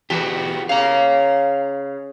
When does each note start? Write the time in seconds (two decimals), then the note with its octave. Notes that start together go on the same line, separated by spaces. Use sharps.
0.10 E2 B3 F#4 G4
0.69 C#3 F5 A#5